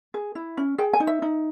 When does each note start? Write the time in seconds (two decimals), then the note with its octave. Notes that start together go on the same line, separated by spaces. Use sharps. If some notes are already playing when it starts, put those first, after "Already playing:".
0.14 G#4
0.35 E4
0.57 C#4
0.78 G#4 G5
0.93 G#5
1.00 D#4
1.07 E5
1.22 D#4